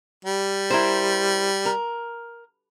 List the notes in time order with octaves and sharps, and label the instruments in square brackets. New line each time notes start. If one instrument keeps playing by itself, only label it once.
[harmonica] G3
[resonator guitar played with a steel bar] E4 A#4 C5
A#4